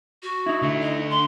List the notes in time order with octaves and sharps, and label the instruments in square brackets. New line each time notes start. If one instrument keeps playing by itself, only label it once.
[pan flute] F#4
[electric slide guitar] D#4 E4
[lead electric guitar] D3 A3
[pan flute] D#5
C6